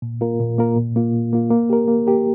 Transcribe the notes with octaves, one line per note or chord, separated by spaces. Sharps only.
A#2
A#3 F4 A#4
A#2
A#3 F4 A#4
A#2
A#3 F4
A#2
A#3 F4
A#3
G4 A#4
A#3
G4 A#4